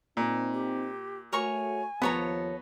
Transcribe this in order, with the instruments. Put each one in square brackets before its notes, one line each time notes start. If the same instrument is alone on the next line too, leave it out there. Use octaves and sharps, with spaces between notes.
[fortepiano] A#2 [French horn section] C4 D#4
[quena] G4
[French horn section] A3 F#4 [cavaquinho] A#4 C#5 C#6 [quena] G#5
[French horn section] D#2 F3 [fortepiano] B3 [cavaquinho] A4 C#5 A#5